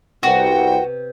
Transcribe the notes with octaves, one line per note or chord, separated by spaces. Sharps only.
C2 C3 B3 F#4 G5